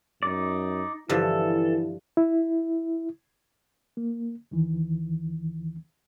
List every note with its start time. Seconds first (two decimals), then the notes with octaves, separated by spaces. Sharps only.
0.23 F#2 D#4 D5
1.09 G2 D3 E3 F3 E4 A4
2.17 E4
3.97 A#3
4.51 D#2 D#3 E3